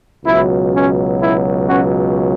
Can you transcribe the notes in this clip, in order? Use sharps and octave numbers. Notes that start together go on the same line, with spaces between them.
C#2 B2 F#3 E4
C#4
E4
C#4 F#4